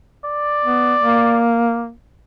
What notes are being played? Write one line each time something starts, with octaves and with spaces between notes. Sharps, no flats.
D5
B3
A#3